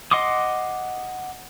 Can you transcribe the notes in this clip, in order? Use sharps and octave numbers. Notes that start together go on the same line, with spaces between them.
D#5 F#5 C6 D6 D#6